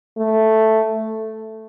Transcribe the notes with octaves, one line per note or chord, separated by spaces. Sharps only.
A3